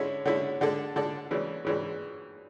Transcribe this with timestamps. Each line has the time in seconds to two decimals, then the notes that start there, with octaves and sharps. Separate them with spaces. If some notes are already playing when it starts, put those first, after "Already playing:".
Already playing: D3 G#3 C#4 E4
0.26 D3 G#3 C#4 E4
0.61 D3 G#3 D4 A4 D5
0.96 D3 G#3 D4 A4 D5
1.31 C#3 E3 G#3 D4
1.65 C#3 E3 G#3 D4